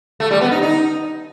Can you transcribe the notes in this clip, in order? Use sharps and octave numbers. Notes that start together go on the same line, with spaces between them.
A3
G3
B3
D#4
D#4